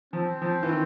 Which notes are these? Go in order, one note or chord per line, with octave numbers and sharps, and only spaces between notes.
F3 C4
F3
E3
D#3